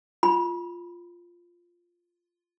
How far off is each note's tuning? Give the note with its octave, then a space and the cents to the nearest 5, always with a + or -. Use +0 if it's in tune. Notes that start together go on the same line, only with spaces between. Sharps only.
F4 +0 B5 +20